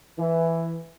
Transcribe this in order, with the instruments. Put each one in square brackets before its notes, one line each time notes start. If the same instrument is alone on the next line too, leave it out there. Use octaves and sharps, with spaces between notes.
[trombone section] E3